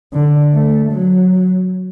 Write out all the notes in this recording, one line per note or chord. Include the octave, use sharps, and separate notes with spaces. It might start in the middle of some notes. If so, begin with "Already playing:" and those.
D3
A3
F#3